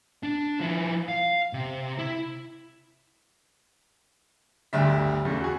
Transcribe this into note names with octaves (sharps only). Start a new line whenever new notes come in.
D4
F3 E4
F5
C3
E4
D1 G1 D2 G3 E5
E2 C#3 A3
F#4 G#4